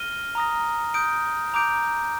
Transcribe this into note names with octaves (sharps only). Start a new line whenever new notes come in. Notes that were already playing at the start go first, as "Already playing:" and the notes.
Already playing: F6 A#6 D#7 G7
A#5 D#6 A#6
D#6 G6 D7
A#5 D6 G6 D7